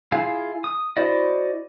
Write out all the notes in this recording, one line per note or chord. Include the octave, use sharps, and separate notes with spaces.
E4 F4 G#4 F5
D#6
E4 F#4 C5 D5 D#5